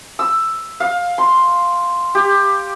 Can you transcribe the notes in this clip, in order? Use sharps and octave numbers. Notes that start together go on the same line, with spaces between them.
E6
F5
C6
G4